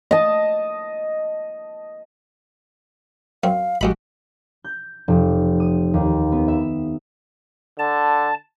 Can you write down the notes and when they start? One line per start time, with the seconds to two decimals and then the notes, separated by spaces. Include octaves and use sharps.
0.11 D#5 A5
3.44 F#2 C4 F5
3.81 A1 F2 G#3 F#4 G4 B5
4.64 G6
5.08 F1
5.60 D#6
5.94 D#2
6.32 B3
6.48 E5
7.79 D3 A5